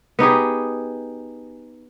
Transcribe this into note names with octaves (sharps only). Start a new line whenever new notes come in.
B3 D#4 G4 G#4